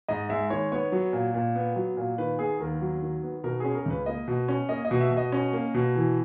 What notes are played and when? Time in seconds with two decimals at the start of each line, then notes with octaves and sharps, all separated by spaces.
0.08 G#2 D#5
0.29 G#3 E5
0.50 D#3 C#5
0.72 B3 C#5
0.92 F#3
1.13 A#2
1.34 A#2
1.55 B3
1.76 F#3
1.97 A#2
2.18 D#3 B4
2.39 B3 G#4
2.60 D#2 A#4
2.81 F#3
3.02 D#3
3.23 B3
3.44 B2 A#4
3.60 C#4 G#4
3.75 A#4
3.86 C#2 B4
4.06 A#3 D#5
4.28 B2
4.48 C#4
4.69 A#3 D#5
4.85 D#5
4.91 B2
5.01 E5
5.11 B2
5.17 D#5
5.32 C#4
5.53 A#3
5.74 B2
5.96 E3